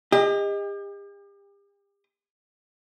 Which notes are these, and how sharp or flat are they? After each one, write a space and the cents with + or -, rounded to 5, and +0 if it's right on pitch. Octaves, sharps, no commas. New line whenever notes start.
G4 +40 D#5 +5